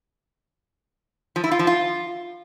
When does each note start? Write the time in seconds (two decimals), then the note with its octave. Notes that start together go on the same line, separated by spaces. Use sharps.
1.36 F3
1.44 E4
1.51 F4
1.59 F3
1.67 F4